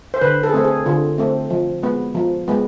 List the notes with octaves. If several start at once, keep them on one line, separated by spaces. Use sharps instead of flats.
C5
D3 B4
A4
G#4
A3 C4 A4
G#4
D3 F4
A3 C4
F3
G#3 B3
F3
G#3 B3